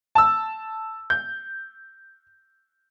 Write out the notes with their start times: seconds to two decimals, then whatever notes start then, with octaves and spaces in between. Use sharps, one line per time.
0.15 A5 E6
1.10 G6